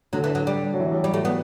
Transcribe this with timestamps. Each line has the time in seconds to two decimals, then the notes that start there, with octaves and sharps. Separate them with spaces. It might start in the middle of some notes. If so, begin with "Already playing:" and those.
0.13 D3 F#3
0.24 E3
0.35 F#3
0.47 G3
0.74 F#3
0.80 E3
0.86 F#3
0.91 G3
1.04 G3
1.14 A3
1.25 B3